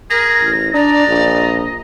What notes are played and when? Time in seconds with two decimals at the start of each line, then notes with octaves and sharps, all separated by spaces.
0.10 G#4 A#4 A#6
0.41 A1
0.74 D4 D5 D#5 A#5
1.08 A#1